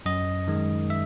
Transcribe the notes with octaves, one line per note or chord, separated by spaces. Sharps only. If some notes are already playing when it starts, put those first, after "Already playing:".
F#2 D#5
D#3 G#3
E5